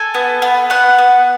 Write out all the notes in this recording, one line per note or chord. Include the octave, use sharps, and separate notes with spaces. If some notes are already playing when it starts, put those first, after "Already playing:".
Already playing: A4 G#5
B3
B3
B3 F#5
B3